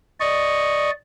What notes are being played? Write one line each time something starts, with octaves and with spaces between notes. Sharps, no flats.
D5 D#5 C#6